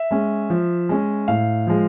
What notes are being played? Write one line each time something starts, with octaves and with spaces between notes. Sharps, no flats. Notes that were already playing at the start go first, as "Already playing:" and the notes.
Already playing: E5
G#3 C#4
F3
G#3 C#4
A2 F5
F3 G#3